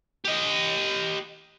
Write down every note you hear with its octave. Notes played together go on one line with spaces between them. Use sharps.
G4 D#5